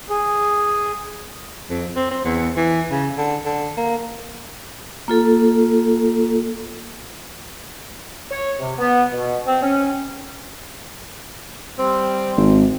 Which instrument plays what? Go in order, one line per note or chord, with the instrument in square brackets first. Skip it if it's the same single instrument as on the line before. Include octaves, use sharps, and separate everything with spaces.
[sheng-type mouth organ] G#4
[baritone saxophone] F2
C4
C4
E2
E3
C#3
D3
D3
A#3
[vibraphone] A#3 F4 A4
[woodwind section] C#5
C3
B3
B2
C4
C#4
[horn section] G3 C4
[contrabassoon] G#1